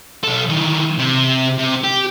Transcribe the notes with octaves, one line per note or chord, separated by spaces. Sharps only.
B1 A4
D#3 E3
C3
C3
G4